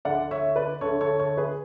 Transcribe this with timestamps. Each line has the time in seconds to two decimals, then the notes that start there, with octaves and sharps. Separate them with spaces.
0.05 D2 D3 D5 F#5
0.31 C#5 E5
0.56 B4 D5
0.81 D2 D3 A4 C#5
1.01 A4 C#5
1.19 A4 C#5
1.38 G#4 B4